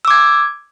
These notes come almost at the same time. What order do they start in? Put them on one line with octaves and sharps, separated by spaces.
E6 D6 G#6